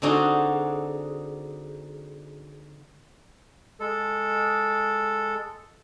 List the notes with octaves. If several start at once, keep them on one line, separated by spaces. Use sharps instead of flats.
D3 C4 D4 D#4 F#4 G#4
G#3 A4